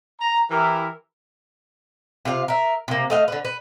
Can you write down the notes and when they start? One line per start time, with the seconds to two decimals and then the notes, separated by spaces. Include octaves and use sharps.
0.20 A#5
0.51 E3 E4 G4 A#4
2.25 C3 F4 A4 F5
2.48 A#4 E5
2.88 C3 A#3
3.10 A3 D#5 F5
3.28 D3 B4
3.45 B4